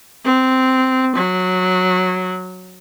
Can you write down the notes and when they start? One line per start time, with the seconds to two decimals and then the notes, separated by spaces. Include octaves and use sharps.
0.25 C4
1.15 F#3